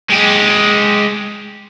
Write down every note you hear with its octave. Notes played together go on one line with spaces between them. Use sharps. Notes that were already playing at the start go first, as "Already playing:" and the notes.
G#3 G4